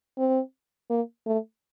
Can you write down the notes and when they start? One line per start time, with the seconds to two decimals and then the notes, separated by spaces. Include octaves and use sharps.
0.18 C4
0.90 A#3
1.27 A3